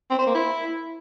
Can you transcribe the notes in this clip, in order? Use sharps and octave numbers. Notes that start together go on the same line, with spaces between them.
C4
C5
A#3
E4